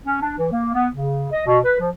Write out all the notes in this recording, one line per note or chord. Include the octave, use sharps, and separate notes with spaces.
C#4
D4
E3
A#3
B3
C#3
D#5
B2
B4
F3